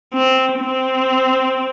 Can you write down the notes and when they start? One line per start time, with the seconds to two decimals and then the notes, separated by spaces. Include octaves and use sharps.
0.14 C4
0.60 C4